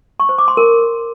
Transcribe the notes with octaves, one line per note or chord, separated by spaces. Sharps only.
C#6
C5
D6
C6
A#4